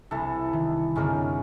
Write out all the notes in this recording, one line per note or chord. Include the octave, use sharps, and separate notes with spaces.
C2 E3 A4
D#3
F#2 D3 G#3 C4 C#4 A#4